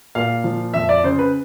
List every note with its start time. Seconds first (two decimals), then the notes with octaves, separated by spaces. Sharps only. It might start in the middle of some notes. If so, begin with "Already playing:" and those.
0.15 A#2 F5
0.44 F3
0.74 F2 E5
0.89 D5
1.04 C#3 C5
1.19 B4